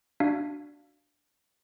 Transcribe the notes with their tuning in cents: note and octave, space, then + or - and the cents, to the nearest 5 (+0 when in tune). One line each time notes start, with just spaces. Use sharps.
D4 +0 F#4 +0 F5 +0